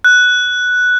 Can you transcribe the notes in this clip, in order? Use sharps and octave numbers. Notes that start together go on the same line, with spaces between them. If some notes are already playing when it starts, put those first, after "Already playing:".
F#6